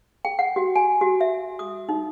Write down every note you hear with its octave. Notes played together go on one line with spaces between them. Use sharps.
G5
F#5
F#4
G#5
F#4
E5
D#6
D#4